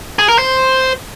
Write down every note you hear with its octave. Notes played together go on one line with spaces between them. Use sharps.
G#4
A#4
C5